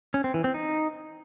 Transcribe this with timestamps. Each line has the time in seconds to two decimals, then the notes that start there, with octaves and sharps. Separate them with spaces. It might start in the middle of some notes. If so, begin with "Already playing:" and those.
0.14 C#4
0.24 C4
0.34 E3
0.44 C4
0.54 D#4